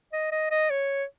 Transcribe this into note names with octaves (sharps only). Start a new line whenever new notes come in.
D#5
D#5
D#5
C#5